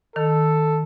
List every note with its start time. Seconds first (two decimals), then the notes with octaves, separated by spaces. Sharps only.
0.16 D#3 A4